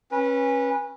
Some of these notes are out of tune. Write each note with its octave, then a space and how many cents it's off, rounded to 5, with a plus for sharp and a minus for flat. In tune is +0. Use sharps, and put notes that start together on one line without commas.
C#4 -25 B4 -25